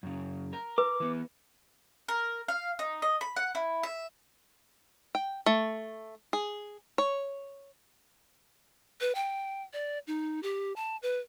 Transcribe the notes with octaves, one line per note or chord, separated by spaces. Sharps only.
F#2 C#3
A#4
B4 D6
E3 B3
A#4
F5
D#4
D#5
B5
F#5
E4
E5
G5
A3
G#4
C#5
B4
G5
D5
D#4
G4
A5
B4